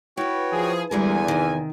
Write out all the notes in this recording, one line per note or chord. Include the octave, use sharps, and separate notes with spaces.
E4 F#4 B4 C#5 G5
F3 G#4
E2 D3 E3 G3 G#3 A#4 G#5
C3 D#3